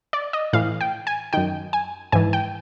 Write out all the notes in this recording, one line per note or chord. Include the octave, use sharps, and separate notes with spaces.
D5
D#5
A2 E3 F5
G5
G#5
F#2 D#3 G5
G#5
G#2 E3 G#5
G5